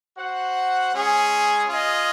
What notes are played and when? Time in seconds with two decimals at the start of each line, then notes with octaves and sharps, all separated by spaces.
0.18 F#4 C5 F#5
0.94 G#3 C#4 G#4
1.68 F4 G#4 D#5